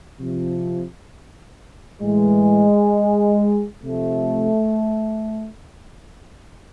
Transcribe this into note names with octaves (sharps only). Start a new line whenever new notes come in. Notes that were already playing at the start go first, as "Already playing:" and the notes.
C3 F3
A2 E3 G#3
C3 F3 A3